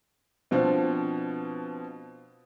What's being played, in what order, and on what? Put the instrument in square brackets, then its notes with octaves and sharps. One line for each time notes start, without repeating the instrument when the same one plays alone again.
[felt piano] B2 F3 C4 D4